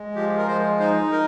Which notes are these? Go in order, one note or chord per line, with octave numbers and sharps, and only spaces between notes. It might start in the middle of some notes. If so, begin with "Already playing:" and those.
Already playing: G#3
F3 G4
A#4
G#3 C5
D#4 C5
A#4